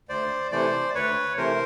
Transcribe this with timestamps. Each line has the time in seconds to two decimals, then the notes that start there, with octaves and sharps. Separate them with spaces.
0.09 D2 C5 D5
0.51 C3 E3 A3 C5 D5
0.95 D2 B4 C#5
1.37 C3 E3 A3 A#4 C5